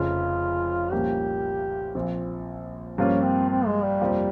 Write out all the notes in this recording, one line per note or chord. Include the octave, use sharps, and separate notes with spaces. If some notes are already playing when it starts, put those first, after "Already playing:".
Already playing: F1 F2 C#3 F4
C2 A#2 F3 A#3 C#4 G4
A#1 A#2 F3 C4
G2 F3 A#3 C#4 F4
C4
C4
G#3
G3
F2 C3 F3 A#3